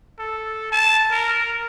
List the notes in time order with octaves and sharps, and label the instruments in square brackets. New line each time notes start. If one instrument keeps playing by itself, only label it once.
[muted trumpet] A4
A5
A#4